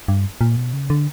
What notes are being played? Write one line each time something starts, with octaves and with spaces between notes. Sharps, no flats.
G2
A#2
B2
C#3
D3